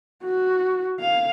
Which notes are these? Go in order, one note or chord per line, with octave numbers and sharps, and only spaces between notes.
F#4
F5